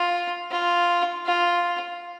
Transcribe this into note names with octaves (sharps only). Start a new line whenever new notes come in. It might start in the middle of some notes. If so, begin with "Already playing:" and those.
Already playing: F4
F4
F4